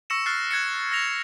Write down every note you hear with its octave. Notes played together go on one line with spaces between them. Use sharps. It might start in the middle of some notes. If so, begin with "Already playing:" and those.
C#6 E6 A#6 C#7 E7
F6 F#6 A6 C7
F#6 G#6 A6 C#7
E6 A#6 F7